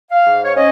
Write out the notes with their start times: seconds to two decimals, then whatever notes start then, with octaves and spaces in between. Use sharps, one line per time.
0.10 F5
0.26 G#2
0.44 C#5
0.56 C#4 D#5